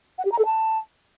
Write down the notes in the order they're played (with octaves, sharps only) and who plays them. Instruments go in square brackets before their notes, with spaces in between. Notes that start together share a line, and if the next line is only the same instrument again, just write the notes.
[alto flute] F#5
G4
A#5
A4
A5